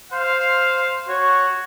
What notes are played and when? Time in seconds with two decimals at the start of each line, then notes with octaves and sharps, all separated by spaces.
0.13 C5 F5
1.09 F#4 C#5